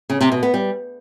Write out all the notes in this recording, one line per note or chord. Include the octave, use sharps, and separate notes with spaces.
C#3
C3
B2
B3
G3